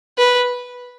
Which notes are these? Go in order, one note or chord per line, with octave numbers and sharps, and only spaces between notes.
B4